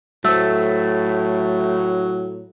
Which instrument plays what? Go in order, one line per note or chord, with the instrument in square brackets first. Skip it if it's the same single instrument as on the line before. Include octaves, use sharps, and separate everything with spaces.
[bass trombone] A2 [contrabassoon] F#3 [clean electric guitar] A3 [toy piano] C5 E6